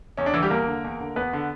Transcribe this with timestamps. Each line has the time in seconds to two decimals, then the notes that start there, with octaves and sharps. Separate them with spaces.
0.17 E2 C#4
0.26 D4
0.34 D3 E3 E4
0.42 G3 G4
0.50 E2 A#3 A#4
0.67 D3
0.84 E2
1.00 D3
1.16 E2 B3 B4
1.33 D3